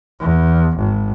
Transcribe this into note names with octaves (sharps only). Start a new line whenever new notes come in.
E2
G#1